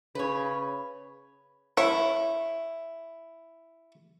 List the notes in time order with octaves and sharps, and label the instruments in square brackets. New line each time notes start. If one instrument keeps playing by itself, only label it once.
[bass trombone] C#3 [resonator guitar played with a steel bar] B4 C#5
[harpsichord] E4 [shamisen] C#5